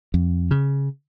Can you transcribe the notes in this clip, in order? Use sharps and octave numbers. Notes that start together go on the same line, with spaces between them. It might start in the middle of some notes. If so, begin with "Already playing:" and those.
F2
C#3